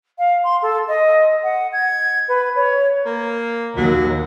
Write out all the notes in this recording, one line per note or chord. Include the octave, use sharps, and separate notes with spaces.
F5
C6
A4
D#5
F#5
G#6
B4
C#5
A#3
D#2 F#3